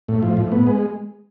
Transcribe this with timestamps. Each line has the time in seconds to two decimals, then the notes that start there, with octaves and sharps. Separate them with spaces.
0.08 A2
0.23 F3
0.37 A2
0.52 B3
0.67 G#3